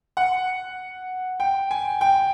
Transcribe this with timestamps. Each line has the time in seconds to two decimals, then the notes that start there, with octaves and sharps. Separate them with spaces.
0.17 F#5
1.40 G5
1.71 G#5
2.01 G5